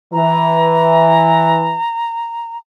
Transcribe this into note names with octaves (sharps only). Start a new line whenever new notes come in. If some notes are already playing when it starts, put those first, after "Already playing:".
E3 A#5